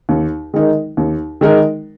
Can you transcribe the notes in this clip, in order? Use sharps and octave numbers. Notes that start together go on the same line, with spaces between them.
D#2
D#3 G#3 D#4 A#4
D#2
D#3 G#3 D#4 A#4